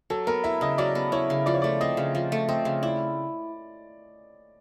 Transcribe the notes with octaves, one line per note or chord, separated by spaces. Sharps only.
F#3 A4
B3 A#4
E4 E5
C#3 D#5
F#3 D5
B3
E4 C#5
C#3
F3 D5
C#5
A3 D5
C4 D#5
C#3
F3 D#5
A3
C4 D#5
C#3
E4 D5